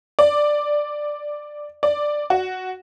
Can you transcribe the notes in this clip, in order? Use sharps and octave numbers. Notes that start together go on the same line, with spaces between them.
D5
D5
F#4